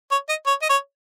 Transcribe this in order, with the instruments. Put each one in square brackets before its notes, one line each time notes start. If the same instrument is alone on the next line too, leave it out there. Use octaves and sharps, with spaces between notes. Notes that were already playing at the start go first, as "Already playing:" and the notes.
[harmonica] C#5
D#5
C#5
D#5
C#5